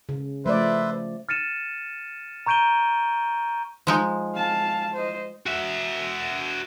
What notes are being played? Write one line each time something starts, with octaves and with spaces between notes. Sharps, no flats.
C#3
F3 A3 B4 C5 D5 E5
F6 A6 C#7 D#7 E7
A#5 C#6 G6 D7 D#7 G7
F3 G#3 D#4
F5 A5
C5 D#5
F#4 E5